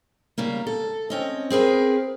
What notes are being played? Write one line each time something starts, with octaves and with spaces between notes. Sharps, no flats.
C#3 G3 A#3
A4
C4 C#4 D#5
C4 G#4 A#4 B4